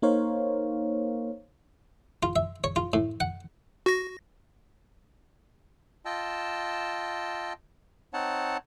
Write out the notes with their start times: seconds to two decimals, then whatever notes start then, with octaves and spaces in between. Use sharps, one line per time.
0.02 A#3 D#4 A#4 C5 C#5 F5
2.23 F4
2.36 E5
2.64 C#5
2.76 F4
2.93 A2
3.20 F#5
3.86 F#4 A#6
6.05 F4 D#5 G5 A5 E6
8.13 C4 D#4 C#5 F#5 A5